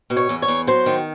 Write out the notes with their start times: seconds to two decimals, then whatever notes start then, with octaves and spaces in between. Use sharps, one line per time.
0.10 B2
0.16 C#5
0.29 E2
0.42 C#5
0.48 E2
0.67 F#3 C5
0.86 D#3